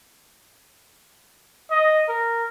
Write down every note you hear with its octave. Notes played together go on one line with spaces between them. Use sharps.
D#5
A#4